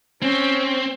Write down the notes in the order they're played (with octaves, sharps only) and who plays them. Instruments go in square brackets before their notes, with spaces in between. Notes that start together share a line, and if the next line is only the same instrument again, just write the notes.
[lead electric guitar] C4 [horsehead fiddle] C#4